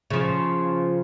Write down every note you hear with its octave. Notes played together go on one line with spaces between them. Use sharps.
C#3 F3